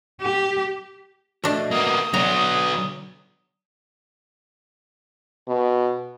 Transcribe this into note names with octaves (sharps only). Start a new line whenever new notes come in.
G4
A3 D4 F#4 D#5
A#3 B3 D#6
D3 F#3 B3 C#5 D5 A#5
B2